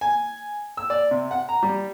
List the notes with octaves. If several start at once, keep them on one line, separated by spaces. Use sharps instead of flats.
G#5
E6
D5
C3
F#5
A#5
G3